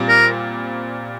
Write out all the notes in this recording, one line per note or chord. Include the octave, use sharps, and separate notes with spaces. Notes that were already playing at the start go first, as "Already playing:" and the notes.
Already playing: A#2 G3 C4
A#4